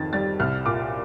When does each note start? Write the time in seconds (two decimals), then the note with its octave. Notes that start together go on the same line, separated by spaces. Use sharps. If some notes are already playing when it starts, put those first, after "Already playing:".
Already playing: F2 D#3 A6
0.13 G3 A6
0.40 C2 F6
0.66 A#2 D6